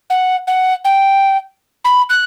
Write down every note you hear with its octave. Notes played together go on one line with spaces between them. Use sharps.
F#5
F#5
G5
B5
F#6